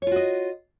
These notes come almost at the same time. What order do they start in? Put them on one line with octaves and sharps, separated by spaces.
C#5 F4 F#4 D#5